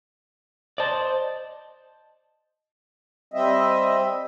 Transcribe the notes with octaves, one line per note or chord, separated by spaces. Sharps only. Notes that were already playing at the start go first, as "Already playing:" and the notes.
C5 D5 D#5 A5
G3 C4 D#5 E5